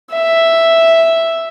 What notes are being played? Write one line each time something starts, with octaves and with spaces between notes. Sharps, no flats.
E5